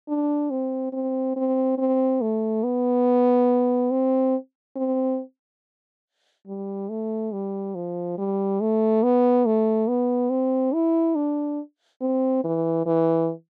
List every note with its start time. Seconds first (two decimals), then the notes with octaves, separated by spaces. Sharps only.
0.08 D4
0.51 C4
0.93 C4
1.36 C4
1.78 C4
2.22 A3
2.63 B3
3.91 C4
4.76 C4
6.47 G3
6.90 A3
7.33 G3
7.75 F3
8.18 G3
8.61 A3
9.03 B3
9.46 A3
9.88 B3
10.30 C4
10.74 E4
11.15 D4
12.02 C4
12.44 E3
12.86 E3